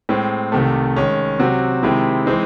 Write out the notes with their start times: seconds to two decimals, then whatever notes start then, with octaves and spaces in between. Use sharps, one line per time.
0.09 A2 G#3 C4
0.52 C2 C3 D#3 A3
0.96 D#3 G#3 C#4
1.39 C3 F#3 C4 F#4
1.83 C3 D#3 G#3 C4 E4
2.26 E3 G#3 C4 D#4